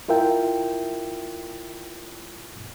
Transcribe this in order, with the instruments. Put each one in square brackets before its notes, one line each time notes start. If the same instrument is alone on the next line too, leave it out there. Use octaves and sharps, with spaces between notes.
[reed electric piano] E4 F4 A#4 E5 G5